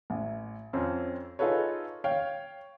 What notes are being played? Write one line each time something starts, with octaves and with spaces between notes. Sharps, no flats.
A1
F2 C4 C#4
D#4 F4 G#4 A4 B4 C#5
C#5 F5 G5